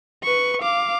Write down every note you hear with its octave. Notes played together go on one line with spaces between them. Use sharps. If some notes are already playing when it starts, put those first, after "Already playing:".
B4 C#6
F5 D6